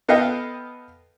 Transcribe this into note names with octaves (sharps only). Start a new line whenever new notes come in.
B3 A4 B4 D#5 F5 G5